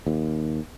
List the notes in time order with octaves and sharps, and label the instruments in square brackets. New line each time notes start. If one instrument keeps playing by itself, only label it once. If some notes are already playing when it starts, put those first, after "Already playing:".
[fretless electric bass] D#2